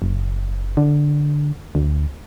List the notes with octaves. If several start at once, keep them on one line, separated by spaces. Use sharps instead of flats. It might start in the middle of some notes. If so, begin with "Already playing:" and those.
F#1
D3
D2